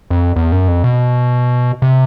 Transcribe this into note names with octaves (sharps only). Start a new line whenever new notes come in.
F2
E2
F#2
F2
B2
C3